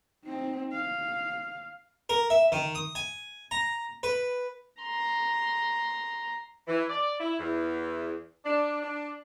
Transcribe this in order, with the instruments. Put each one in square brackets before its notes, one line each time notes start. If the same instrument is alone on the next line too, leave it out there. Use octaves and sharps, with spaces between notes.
[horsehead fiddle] C4 D#4
F5
[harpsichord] A#4
E5
D#3
D#6
G#5
A#5
B4
[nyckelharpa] A#5 C6
[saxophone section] E3
D5
E4
E2
D4
D4